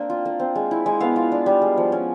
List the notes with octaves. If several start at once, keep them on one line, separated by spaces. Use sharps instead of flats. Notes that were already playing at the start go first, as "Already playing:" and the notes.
Already playing: A#3 C4 D4
F4
A#3
C4
G#3
E4
G#3
B3 F5
F4
D4
G3
G#3
F3
C#4